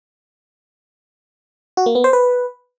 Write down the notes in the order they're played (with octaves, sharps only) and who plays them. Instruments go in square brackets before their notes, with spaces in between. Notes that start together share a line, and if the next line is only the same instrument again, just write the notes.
[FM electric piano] F#4
A#3
B3
C5
B4